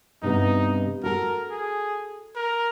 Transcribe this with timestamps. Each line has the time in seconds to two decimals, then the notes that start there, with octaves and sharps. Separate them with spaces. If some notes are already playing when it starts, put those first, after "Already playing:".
0.22 G2 C3 B3 D#4
1.04 F#4 A4 A#4
1.51 G#4
2.36 A#4